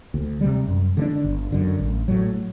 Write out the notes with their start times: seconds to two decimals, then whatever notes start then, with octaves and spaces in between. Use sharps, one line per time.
0.14 D2
0.41 C3 G3
0.68 F#2
0.97 D3 G3
1.02 D4
1.24 G1
1.52 F#2 D3
1.81 A1
2.08 A2 F#3